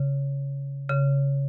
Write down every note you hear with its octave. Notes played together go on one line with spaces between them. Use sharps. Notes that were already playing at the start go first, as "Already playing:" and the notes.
Already playing: C#3
C#3